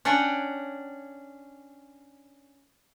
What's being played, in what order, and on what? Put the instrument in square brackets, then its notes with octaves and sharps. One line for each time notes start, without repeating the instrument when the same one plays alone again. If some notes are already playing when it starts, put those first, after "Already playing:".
[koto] C#4 D4 C#5 D5 F#5 G5